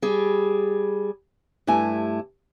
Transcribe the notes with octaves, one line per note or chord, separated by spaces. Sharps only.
G3 G#4
G2 A3 E4 G#5